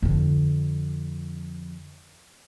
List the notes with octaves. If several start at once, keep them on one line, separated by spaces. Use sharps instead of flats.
F2 D3